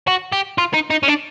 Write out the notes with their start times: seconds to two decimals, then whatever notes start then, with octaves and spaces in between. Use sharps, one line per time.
0.07 F#4
0.32 G4
0.58 F4
0.74 D#4
0.90 D#4
1.03 C#4
1.08 D4